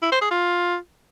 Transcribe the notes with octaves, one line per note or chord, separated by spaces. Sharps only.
E4
C5
G#4
F4